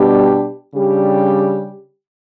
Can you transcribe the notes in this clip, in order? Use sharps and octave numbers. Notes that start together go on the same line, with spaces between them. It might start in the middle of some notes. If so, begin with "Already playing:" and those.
Already playing: B2 G3 D4 G4
C#3 G3 D4 G4